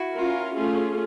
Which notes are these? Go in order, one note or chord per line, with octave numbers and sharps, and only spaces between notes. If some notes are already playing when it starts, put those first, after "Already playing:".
Already playing: E4 F#4
C#4 F4 A#4
A3 C#4 F4 G#4